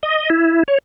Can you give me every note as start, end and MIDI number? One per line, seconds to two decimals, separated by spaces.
0.03 0.30 75
0.30 0.63 64
0.68 0.78 73